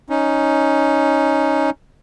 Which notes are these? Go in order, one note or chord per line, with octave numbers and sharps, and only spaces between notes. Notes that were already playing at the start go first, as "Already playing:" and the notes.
C#4 D#4